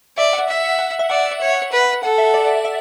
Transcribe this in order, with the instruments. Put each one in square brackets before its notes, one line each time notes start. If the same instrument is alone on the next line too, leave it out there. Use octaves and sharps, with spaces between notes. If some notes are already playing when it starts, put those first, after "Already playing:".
[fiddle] D5 [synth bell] E5
[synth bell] F#5
[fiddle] E5
[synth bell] F#5
E5
[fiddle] D5 [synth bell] F#5
[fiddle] C#5
B4
[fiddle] A4 [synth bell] F#5
[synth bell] E5
D5
E5